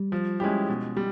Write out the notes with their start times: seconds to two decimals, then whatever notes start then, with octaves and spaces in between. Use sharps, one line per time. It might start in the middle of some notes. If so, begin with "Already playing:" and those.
Already playing: G3
0.12 F3
0.40 G#3 C#4 E4 G4
0.69 B2
0.97 G3